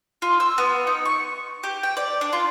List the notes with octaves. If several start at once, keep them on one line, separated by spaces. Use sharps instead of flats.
F4
E6
B3
D#4
C#6
G4
G5
D5
D4
F4